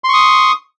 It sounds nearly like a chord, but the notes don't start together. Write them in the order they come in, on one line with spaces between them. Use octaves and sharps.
C6 C#6 D#6